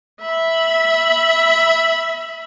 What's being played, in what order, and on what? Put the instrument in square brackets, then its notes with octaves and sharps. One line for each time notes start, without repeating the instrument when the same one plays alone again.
[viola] E5 B5